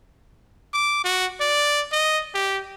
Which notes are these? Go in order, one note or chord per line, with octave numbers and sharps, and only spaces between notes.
D6
F#4
D5
D#5
G4